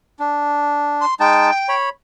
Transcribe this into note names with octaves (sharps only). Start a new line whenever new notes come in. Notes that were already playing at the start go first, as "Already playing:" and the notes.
D4
C6
G#3 D#4 G5 A5
C#5 B5